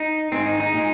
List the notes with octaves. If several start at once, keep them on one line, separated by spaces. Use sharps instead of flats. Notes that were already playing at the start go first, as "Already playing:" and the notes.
Already playing: D#4
G#2 D#3 G#3 C4
D#4
D#4
A#2 G#3